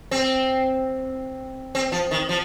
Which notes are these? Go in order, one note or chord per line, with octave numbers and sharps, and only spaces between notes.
C4
C4
F3
D#3
F3